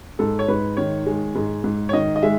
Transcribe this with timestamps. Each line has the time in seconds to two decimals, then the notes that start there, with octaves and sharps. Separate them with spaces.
0.19 G#2 A4
0.39 C#5
0.48 G#2 B4
0.77 D#3 C#5
1.06 G#3
1.35 G#2
1.64 G#2
1.89 C#5
1.93 D#3 D#5
2.16 D#5
2.22 G#3 E5